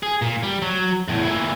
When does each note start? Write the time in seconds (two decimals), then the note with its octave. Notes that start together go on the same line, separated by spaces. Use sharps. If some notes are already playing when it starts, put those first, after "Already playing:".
0.03 G#4
0.22 A#2
0.43 G3
0.62 F#3
1.08 E2 A2
1.24 A#2 E4